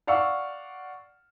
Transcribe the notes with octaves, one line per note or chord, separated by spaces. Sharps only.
D5 F5 F#5 C#6 E6